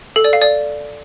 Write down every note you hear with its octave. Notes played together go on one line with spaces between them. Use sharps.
A4
D5
F5
D5